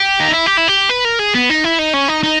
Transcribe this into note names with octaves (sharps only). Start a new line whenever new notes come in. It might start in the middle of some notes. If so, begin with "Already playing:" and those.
Already playing: G4
D#4
E4
G4
E4
G4
B4
A#4
G#4
B3
D#4
E4
D#4
C#4
D#4
D#4